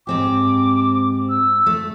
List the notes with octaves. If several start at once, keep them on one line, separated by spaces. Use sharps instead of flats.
G#2 C4 G4 D6
E6
A3